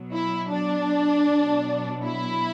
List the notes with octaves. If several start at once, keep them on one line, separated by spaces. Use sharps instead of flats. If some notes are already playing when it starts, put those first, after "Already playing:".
Already playing: B2 F#3
E4
D4
B2 F#3
E4